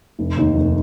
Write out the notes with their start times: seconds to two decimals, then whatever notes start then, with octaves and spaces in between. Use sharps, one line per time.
0.19 F1
0.37 D#2 D#3
0.55 F1